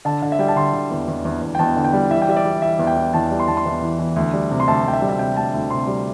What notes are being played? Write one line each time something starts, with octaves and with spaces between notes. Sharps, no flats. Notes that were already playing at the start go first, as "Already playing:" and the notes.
D3 A5
D3
E5
G3 G5
A5
D3 C6
D3
E2
E2
E2
E2
G5
E2 A5
D3
G5
G3
E3 E5
G5
G3 E5
D5
G3
E3 E5
E2
G5
E3
E2 A5
G3
C6
E2 A5
C6
E2
E3
E3
D2
G3
C3
C6
D2 A5
D2 G5
E5
G3
E5
C3 G5
D2 A5
D2
C3 C6
G3